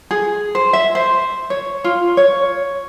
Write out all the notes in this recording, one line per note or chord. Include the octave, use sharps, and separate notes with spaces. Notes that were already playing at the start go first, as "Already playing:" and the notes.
G#4
C5
E5
C5
C#5
F4
C#5